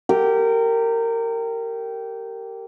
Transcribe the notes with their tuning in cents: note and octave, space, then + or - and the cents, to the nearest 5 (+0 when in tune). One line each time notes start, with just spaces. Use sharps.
G4 -10 A#4 -25